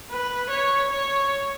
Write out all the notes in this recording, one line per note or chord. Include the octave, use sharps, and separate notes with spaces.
B4
C#5
C#5